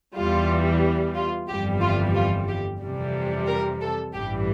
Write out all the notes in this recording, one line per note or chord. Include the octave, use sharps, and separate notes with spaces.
E2 E3 G3 F4
F4
G1 F2 E3 G3 G4
F4
F4
G4
F2 C3 E3 G3
A#4
A4
A1 G2 E3 G3 G4